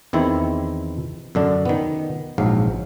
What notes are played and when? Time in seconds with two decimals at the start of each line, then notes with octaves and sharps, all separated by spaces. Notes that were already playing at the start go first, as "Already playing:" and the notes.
0.13 E2 D#3 C4 E4
1.35 F#2 D3 D4
1.65 D#3 B3
2.38 A#1 G#2 F#3 F5